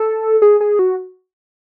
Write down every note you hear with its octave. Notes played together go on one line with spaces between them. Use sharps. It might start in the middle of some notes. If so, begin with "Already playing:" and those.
Already playing: A4
G#4
G#4
F#4